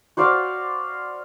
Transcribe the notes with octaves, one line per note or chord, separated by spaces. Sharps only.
F#4 C5 D5 F5